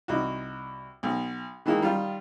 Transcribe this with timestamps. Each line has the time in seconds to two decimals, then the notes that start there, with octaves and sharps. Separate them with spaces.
0.08 C2 D#4 F#4
1.03 B1
1.66 D#3 E3 G#3 A#3
1.80 D#3 G3 F4